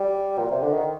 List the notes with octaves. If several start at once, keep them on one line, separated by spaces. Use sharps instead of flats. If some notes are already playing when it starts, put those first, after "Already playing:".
Already playing: G3
A#2
C3
D3
D#3